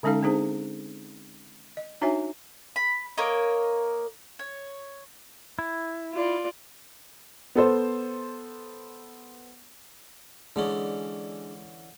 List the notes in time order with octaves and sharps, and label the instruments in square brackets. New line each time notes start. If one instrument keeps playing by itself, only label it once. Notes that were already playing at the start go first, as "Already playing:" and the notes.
[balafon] D3 G#3 C#4 D#4 A4 F5
C4 D4 D#4 G#4 C5
D#5
D4 D#4 F#4 C#5 E5 G#5
[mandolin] B5
A#3 A#4 C#5 D#5
C#5
[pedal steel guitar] E4
[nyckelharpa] F4 D5
[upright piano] B3 A4 C5
[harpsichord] D3 E3 C#4 [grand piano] G#3 [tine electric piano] D4 G#4 D5